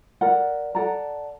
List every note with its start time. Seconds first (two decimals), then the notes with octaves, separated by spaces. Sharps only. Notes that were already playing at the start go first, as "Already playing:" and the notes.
0.21 A#4 D5 F#5
0.75 A4 D5 F#5 A#5